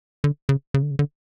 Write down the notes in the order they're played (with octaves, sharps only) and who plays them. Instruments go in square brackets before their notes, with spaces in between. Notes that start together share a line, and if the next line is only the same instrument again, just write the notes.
[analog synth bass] D3
C#3
C#3
D3
C#3
D3